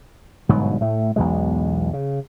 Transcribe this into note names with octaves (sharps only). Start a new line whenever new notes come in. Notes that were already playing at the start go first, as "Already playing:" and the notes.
G1 G#2 B2 F#3
A2 A3
B1 E2 B2 G#3
C#3